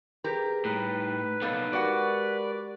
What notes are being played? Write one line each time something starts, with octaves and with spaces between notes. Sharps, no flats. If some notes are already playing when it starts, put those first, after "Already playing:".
G4 G#4 A#4 B4
A2 G3 D#4 B4 A#5
G3 A#3 B3 D#4 A4 B5
G#3 F#4 G4 A#4 D5 F#5